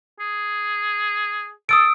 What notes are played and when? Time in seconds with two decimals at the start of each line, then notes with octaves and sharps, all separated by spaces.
0.20 G#4
1.69 A4 D#6 E6 D7